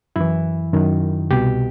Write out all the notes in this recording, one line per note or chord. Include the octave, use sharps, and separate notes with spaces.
F#2 E3 E4
F#2 D#3
C2 B2 G4